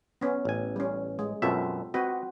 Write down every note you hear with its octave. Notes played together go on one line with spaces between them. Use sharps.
B3 C#4
A1 G#5
G3 C#4
G#3
F#2 B2 C4 F4 A4 E5
C4 F#4 B4 D#5